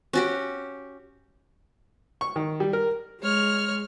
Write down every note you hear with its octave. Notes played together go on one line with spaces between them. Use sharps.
C#4 F#4 G4
C#6
D#3
G3
A#4
G#3 C#5 F6